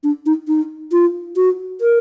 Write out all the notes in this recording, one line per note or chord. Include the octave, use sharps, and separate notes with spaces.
D4
D#4
D#4
F4
F#4
A#4